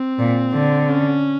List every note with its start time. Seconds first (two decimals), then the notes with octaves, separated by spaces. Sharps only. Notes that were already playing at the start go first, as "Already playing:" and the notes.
Already playing: C4
0.19 A#2
0.53 D3
0.86 C#4